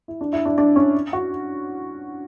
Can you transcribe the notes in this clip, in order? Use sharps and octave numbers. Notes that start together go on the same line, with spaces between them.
E4
D4
E4
D4
D4
C#4
F#4